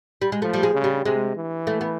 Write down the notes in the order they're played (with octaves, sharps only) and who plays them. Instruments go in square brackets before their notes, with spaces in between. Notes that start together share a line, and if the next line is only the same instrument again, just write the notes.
[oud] G3
G#3
[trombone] F3 [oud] A3
[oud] G3
G#3
[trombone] C#3
[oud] G3
[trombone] C3 [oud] G#3
[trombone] E3
[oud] A3
B3